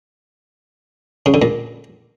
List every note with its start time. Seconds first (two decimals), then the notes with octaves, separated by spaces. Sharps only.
1.26 C#3
1.34 D3
1.42 A#2